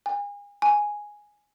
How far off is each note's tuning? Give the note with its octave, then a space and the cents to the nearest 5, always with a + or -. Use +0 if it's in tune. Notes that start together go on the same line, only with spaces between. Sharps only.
G#5 -35
G#5 +0